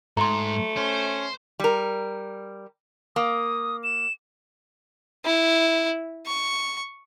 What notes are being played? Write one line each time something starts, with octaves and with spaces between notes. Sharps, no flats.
G#2 A3 A#5 C6
C#4 C5
G3 A#4
A#3 D#6
E7
E4
C#6